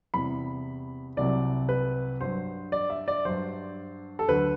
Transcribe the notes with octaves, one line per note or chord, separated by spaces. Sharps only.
E2 C3 G3 B5
C2 C3 F#3 D5
B4
G2 F#3 C5
D5
E5
D5
G2 F#3 C5
A4
D2 D3 F#3 B4